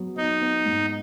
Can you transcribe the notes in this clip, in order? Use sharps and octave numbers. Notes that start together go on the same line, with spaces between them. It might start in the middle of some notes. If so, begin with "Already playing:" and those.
Already playing: F#3 B3
B3 D#4
B3
G#2